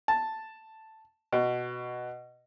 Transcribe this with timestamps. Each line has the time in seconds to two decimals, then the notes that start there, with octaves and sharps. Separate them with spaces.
0.08 A5
1.33 B2